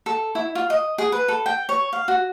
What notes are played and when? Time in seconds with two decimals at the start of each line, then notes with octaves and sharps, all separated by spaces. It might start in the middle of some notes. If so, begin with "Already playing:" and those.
0.06 A4
0.35 E4
0.55 F4
0.70 D#5
0.98 G#4
1.12 B4
1.28 A4
1.46 G5
1.69 C#5
1.93 F5
2.08 F#4